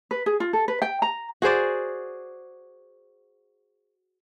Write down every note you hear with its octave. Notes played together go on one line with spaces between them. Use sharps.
B4
G#4
F4
A4
B4
G5
A#5
F#4 G#4 C5 D5